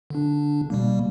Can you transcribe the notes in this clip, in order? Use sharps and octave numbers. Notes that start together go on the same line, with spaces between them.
D3 D4
B2 G3 A#3